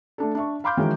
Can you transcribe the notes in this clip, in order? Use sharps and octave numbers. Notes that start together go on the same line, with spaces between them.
A3 D4 A4
D4 E5 C#6
F5 B5 C6 D6 F6 G6
D#3 E3 F#3 G#3 C#4